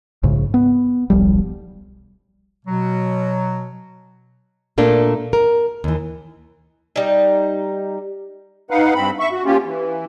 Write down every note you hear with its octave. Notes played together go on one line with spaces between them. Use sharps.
A#1 G#2 C#3
B3
D#1 B1 F3 G3
B2 F#3
A#2 A3 A#3 D4
A#4
D#2 E3
G3 D#4
D#4 B4 F5 F#5
G2 C4 B5
E5 C#6
F#4
A#3 C#4 F4 G4
E3